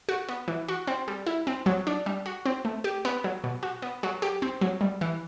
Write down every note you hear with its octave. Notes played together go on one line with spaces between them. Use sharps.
F#4
B3
E3
F#4
C4
G3
E4
C4
F#3
D4
G3
F#4
C4
A3
G4
B3
F#3
B2
F#4
B3
F#3
G4
C4
F#3
G3
E3